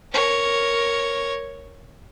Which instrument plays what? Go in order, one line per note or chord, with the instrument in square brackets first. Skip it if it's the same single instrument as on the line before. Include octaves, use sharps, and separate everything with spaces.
[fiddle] A#4 C#5